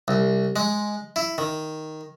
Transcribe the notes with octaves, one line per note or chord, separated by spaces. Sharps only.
C2
G#3
E4
D#3